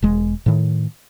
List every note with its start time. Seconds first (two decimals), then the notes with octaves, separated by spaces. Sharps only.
0.02 E1 G#3
0.46 A2 D#3